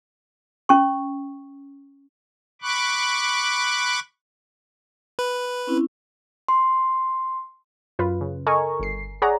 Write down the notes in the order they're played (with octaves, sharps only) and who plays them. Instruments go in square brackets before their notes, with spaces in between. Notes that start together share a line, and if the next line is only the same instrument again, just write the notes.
[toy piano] C#4 C#6
[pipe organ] B5 C#6 D6 F#6
[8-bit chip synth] B4
[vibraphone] C4 C#4 E4
[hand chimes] C6
[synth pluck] F#2 F4 B4
C#3
A4 A#4 D#5 G#5 A#5 C#6
G1 C7
G#4 C#5 D5 F#5 A#5